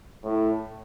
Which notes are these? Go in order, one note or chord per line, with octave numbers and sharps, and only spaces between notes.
A2